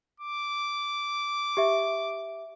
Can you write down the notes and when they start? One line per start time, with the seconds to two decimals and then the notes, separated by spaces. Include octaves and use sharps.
0.20 D6
1.57 G4 E5